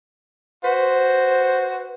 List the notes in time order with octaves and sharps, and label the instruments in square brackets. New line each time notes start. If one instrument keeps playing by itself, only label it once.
[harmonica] F#4 [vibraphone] B4 [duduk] C5